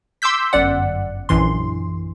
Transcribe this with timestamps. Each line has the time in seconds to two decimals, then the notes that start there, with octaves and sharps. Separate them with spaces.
0.22 C6 D6 E6 G6 B6
0.53 G1 F#2 D5 F#5
1.29 A#1 F#2 E3 C6